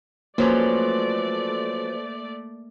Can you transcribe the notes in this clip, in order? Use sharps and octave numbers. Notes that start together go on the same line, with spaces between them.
F3 F#3 A3 A#3 C#4 B4 C5 D5